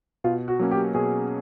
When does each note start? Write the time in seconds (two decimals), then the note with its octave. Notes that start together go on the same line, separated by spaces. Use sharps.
0.24 B2 F4
0.48 F#4
0.59 F#3 A#3 C#4
0.71 G4
0.95 B2 G#4